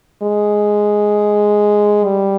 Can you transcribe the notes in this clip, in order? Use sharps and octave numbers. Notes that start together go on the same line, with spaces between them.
G#3
G3